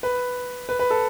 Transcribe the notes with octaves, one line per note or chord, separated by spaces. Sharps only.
B4
B4
B4
A4